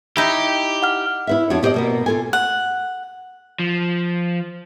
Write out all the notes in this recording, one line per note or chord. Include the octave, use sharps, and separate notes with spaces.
D#4 E4 G4
F#5 F6
E4 B4 E5
F2 D4 F#4 C#5 A5
E4 G4 C5 D5 D#5
B2 A#3 B3
F4 A4 G#5
F#5
F3